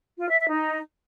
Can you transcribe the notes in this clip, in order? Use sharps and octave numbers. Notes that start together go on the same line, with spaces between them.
F4
E5
E5
D#4